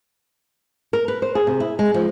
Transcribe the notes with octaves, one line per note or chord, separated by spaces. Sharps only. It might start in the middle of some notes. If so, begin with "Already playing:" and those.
A#4
B4
C5
G#4
C3
E4
G#3
F3